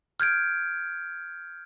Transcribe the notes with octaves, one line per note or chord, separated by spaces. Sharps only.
F6 G6 G#6 D7